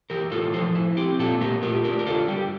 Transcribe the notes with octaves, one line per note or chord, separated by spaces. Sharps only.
E3 G4 A#4
A2 F4 A4
F3 A4 C5
E4
C4 G4
A#2 F4 A4
A3 G4 A#4
F4 G4 A#4
D4 G4 A#4
A#4
D3 F4 A4
G3 G4